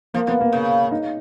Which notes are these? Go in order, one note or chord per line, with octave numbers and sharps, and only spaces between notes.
F3 A#3
F3 B3
A#3
C#3
D#4